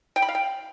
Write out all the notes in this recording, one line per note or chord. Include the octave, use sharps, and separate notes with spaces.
G5
B5
F5
G5